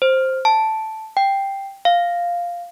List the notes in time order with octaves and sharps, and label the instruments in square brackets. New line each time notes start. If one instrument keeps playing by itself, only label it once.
[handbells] C5
A5
G5
F5